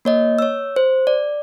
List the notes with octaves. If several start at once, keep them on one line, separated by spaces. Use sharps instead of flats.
A#3 C#5 D#5
C#5 E6
C5
D5